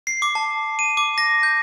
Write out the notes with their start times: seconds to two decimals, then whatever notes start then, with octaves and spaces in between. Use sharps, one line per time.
0.07 C7
0.22 D6
0.35 A5
0.79 D#7
0.97 D6
1.18 A#6
1.43 G6